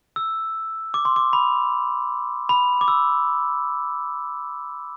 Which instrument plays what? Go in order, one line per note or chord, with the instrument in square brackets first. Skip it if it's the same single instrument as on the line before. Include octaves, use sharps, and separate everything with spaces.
[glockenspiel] E6
D6
C6
D6
B5
B5
D6
E6